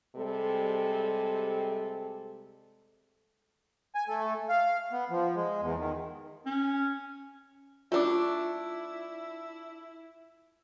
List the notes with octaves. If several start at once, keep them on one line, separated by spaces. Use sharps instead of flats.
C3 G3 G#3 A4
G#5
A3
F5
B3
F3
G#3
E2
D#3
C#4
A3 D4 E4 F4 D6